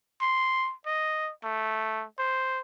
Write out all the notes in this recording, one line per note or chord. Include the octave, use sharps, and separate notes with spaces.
C6
D#5
A3
C5